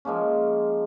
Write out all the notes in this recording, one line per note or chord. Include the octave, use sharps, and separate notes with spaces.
F3 G#3 A#3 C#4